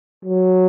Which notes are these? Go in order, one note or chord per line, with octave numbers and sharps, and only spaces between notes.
F#3